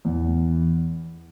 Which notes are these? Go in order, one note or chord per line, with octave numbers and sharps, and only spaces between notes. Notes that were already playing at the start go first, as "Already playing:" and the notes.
E2